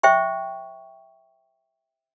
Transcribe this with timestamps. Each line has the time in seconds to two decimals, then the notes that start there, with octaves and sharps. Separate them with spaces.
0.03 C5 E5 G5 C#6